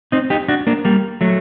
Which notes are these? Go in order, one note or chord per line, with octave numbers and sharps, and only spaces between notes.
C4 D#4
D#4 G4
D4 F#4
A#3 D4
G3 A#3
F#3 A3